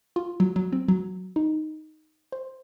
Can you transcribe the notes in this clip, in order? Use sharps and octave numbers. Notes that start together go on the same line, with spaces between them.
F4
F#3
F#3
C4
F#3
D#4
C5